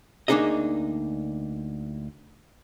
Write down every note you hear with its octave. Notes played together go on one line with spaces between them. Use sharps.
D2 A#3 D4 D#4 G#4 D#5